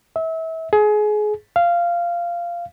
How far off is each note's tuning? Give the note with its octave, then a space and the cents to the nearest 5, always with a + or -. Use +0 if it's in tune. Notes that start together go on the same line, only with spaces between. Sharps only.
E5 -30
G#4 +25
F5 -15